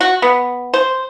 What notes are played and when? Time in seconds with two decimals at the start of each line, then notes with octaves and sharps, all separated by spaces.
0.01 F#4
0.22 B3
0.74 C5